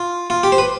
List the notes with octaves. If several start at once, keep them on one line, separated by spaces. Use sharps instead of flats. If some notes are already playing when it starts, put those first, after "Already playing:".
Already playing: F4
F4
G4
C5
B4